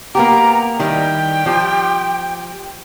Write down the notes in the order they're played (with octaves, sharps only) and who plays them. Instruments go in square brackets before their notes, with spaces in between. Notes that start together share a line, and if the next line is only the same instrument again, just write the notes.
[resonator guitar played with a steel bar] A#3 B3 G4 [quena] A#5
[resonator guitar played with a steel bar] D#3 G3 E4 [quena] G5
[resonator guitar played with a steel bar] F3 G4